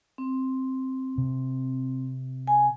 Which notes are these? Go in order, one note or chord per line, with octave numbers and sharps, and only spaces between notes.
C4
C3
G#5